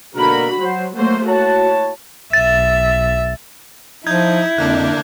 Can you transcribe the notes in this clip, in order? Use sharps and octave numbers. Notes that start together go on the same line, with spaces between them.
B2 D3 A#3 F#4 A#4 B5
F#3 F#4 C5
F#3 A3 A#3 F#4 C5
E4 F#4 C#5 A5
B1 E5 A6
F3 D#4 E4 G6 G#6
F2 D3 A#3 D4 F#6